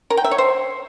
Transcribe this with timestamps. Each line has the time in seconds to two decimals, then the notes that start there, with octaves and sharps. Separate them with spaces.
0.10 A#4
0.17 G5
0.24 E5
0.31 C#5
0.38 C5